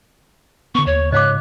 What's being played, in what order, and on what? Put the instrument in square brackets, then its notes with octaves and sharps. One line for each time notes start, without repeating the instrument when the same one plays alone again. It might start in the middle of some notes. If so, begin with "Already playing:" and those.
[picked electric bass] D3 B3 [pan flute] C#6
[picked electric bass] D#2 [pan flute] C#5
[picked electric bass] G#2 C#3 [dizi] C#5 [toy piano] D#5 F5 D6 [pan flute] F#6